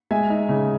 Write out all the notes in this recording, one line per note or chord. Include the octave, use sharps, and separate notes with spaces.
G#3 E5 G#5
D#4
C#3